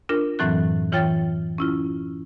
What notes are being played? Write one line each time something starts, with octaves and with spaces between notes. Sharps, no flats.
D4 F4 A#4
F#2 A2 E3 F#3 C4 F#6
E3 F4 C#5 G5 A6
C#4 E4 F4